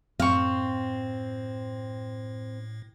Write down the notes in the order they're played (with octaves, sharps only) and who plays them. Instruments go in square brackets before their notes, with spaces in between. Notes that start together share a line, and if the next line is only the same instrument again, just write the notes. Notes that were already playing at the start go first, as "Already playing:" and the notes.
[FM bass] F#2 [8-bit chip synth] A2 [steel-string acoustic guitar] C4 [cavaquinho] F5 C#6